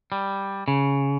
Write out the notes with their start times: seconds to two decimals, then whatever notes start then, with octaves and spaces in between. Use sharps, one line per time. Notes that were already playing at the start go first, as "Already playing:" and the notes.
0.12 G3
0.68 C#3